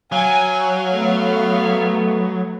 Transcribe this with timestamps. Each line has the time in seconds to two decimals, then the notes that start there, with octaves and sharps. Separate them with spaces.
0.12 F#3 F5 G#5
0.91 A3 B3